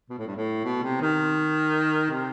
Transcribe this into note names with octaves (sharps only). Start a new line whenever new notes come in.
B2
A2
G2
A2
B2
C3
D#3
C3